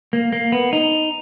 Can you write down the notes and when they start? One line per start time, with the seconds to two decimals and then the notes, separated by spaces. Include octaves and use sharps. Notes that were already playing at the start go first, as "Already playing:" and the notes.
0.13 A#3
0.33 A#3
0.52 B3
0.73 D#4